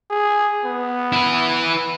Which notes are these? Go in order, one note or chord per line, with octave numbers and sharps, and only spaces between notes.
G#4
B3
E4 B4